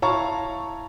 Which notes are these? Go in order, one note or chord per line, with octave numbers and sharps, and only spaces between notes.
E4 C#5 F5 A5 A#5 C#6